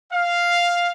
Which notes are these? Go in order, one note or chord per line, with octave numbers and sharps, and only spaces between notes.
F5